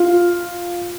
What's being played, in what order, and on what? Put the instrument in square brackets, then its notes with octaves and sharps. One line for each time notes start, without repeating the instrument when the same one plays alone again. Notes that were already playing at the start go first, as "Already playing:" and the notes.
Already playing: [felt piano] F4